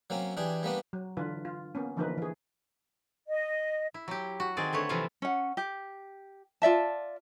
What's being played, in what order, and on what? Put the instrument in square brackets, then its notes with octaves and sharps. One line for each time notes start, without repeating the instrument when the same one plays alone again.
[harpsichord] F#3 A#3 C4 C#4
E3 D4 G4 G#4
G3 A#3 B3 D4
[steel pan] F#3
D3 E3 F4 B4
F4
A#3 B3 C#4
D3 E3 F3 A#3 D#4 B4
E3 G#4
[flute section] D#5
[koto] E4
F#3 G4
F#4
D#3 C4 G#4 D5
D3 A3 B4 C#5
C3 E3 F3 E4 F4
[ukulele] C#4 F#5
G4
F4 D5 E5 A5